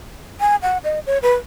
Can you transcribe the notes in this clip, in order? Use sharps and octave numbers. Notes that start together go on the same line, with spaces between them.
G#5
F#5
D#5
C#5
B4